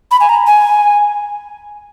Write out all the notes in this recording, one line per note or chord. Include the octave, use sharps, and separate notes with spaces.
B5
G#5
A#5
G#5